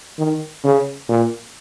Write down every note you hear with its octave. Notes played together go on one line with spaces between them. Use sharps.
D#3
C#3
A#2